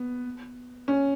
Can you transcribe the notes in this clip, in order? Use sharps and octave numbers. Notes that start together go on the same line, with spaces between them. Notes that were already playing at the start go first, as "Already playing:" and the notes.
Already playing: B3
C#4